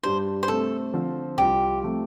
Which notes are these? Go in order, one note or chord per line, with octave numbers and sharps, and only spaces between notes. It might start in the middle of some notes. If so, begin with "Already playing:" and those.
G2 G3 D4 G4 C5
C5
C3 A3 C4 A4
D3 F3 C4 F4
C2 C3 G3 F4 G4
C3 F3 A3